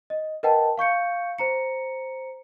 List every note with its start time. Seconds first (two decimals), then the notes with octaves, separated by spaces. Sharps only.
0.10 D#5
0.43 A#4 B4 D#5 F#5 G5 A5
0.78 F5 C#6 G6 C#7
1.38 C5 A#5 C#7